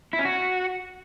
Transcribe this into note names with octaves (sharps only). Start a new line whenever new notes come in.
E4
C#4
F#4